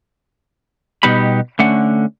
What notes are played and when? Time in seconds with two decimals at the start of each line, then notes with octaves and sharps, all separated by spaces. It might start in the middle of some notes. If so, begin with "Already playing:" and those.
1.03 B2 G3 B3 D#4 G4 B5
1.59 D3 A3 C#4 F#5